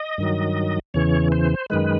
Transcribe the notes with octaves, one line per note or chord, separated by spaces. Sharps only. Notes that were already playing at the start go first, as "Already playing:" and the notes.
Already playing: D#5
G2 D#3 F#3
E2 C#3 E3 C#5
C5
F#2 D#3 G#3 B4